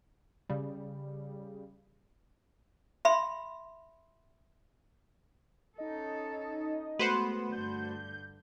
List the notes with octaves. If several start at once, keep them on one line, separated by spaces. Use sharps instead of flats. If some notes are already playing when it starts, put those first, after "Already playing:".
C#3 G3
E5 B5 C6
C#4 D#4 A4 D#5
G#3 A3 B3 F#4 B4 C5 F#5
G2 D3 G6